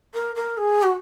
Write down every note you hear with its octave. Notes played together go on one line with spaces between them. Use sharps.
A#4
A#4
G#4
F#4